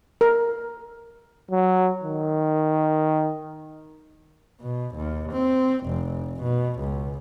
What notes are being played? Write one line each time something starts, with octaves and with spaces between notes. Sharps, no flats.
A#4
F#3
D#3
B2
D#2
C4
F1
B2
C#2